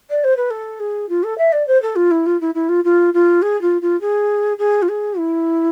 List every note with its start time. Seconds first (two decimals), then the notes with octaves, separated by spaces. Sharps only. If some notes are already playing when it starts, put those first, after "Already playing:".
0.10 D5
0.24 C5
0.36 B4
0.50 A4
0.79 G#4
1.09 F4
1.23 A4
1.38 E5
1.52 D5
1.67 C5
1.82 A4
1.95 F4
2.11 E4
2.26 F4
2.41 E4
2.54 E4
2.69 F4
2.84 F4
3.13 F4
3.42 G#4
3.61 F4
3.81 F4
4.01 G#4
4.58 G#4
4.82 F4
4.88 G#4
5.18 E4